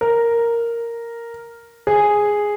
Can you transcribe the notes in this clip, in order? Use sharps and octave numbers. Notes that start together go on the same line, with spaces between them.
A#4
G#4